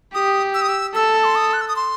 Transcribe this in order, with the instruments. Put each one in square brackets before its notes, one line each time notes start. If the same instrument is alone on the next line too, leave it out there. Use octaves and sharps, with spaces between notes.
[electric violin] G4 [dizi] D#6
[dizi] E6
D#6
E6
[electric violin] A4 [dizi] E6
[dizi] C6
D#6
F#6
E6
D#6
C6